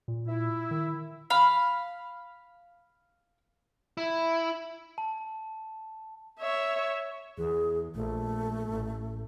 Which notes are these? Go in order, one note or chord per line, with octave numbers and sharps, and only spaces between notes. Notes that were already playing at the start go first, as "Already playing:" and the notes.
A#2
E4
D#3
F5 B5
E4
A5
C#5 E5
E2 G#4
A#1 A3
A1